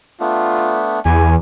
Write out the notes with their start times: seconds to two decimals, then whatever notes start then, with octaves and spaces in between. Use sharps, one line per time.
0.20 A3 B3 D4 F4
1.05 E2 G4 G#5